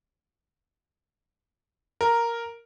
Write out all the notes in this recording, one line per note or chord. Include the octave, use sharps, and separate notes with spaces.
A#4